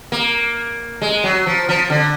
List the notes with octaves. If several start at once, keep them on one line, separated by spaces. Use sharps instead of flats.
A#3
G#3
F#3
F3
F3
D3